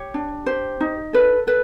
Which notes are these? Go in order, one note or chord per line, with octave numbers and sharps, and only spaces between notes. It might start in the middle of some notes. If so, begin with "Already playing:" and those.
Already playing: G4 C#5
D4
G4 C5
D#4
A4 B4
A4 B4